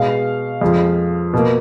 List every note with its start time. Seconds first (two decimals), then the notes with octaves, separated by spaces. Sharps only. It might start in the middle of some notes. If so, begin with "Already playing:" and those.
Already playing: B2 G#3 F5
0.61 F2 F3 G#3
1.33 B2 A#3